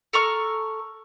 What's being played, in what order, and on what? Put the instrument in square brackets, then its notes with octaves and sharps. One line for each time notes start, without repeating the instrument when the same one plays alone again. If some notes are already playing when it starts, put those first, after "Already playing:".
[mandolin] A4 A#5 C#6 F6